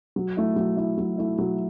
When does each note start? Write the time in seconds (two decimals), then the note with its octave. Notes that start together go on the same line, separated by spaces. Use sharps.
0.16 F#3
0.37 A3 E4
0.56 F#3
0.77 A3 E4
0.97 F#3
1.18 A3 E4
1.38 F#3